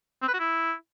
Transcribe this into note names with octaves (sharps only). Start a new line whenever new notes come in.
C4
B4
F#4
E4